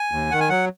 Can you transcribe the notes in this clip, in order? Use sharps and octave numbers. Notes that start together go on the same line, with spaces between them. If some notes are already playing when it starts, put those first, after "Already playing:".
Already playing: G#5
D#2
D#3 F#5
G#5
F#3 F#5